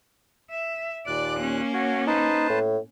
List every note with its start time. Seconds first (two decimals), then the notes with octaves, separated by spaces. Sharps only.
0.50 E5
1.07 D#2 A#2 D5 F#6
1.38 A#3 C#4
1.73 F#4 C#5
2.07 D#4 B4 C5 A5
2.50 A2